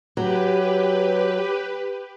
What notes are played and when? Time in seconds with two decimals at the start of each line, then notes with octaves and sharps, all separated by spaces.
0.17 F#3 G4 B4